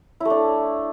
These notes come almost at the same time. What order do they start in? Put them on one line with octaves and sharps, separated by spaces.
E4 A3 D4